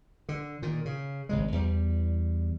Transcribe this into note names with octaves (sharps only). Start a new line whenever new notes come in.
D3
A#2 D#3
C#3
G#1 C#3 G#3
E2 G3